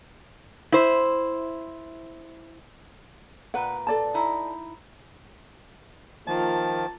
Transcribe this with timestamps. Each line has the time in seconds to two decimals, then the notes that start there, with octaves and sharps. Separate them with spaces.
0.72 E4 C5
3.54 A#2 B4 F#5 G5
3.87 A4 D5 A5
4.14 D#4 E4
6.27 D#3 F3 A#3 F4 A5